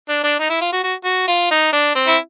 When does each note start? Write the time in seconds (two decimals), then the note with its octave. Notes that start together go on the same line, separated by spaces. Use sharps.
0.09 D4
0.23 D4
0.39 D#4
0.49 E4
0.61 F4
0.73 F#4
0.84 F#4
1.04 F#4
1.28 F4
1.51 D#4
1.73 D4
1.95 C4
2.08 E4